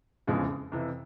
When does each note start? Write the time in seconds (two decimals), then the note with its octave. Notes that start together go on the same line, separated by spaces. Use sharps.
0.27 F1 E2 C#3 F3 G#3
0.72 F2 C3 E3